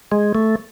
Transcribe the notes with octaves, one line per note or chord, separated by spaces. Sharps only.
G#3
A3